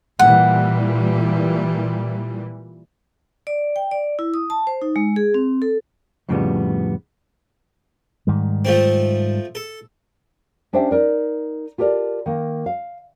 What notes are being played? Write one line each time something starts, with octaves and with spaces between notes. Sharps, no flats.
A#2 E3 G3 F#5
D5
G5
D5
E4
D#6
A5
C5
D#4
G#3
G#4
C4
A4
F2 A2 C#3 F3 G3 B3
G#2 D#3 G3
F3 A3 C4
A4
C#4 D4 G4 C5 E5 G5
D#4 A#4 D5
F4 G4 A4 A#4 D5
D#3 A#3
F5